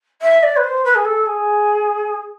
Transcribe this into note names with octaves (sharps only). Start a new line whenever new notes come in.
E5
D5
B4
C5
B4
G#4
A4
G#4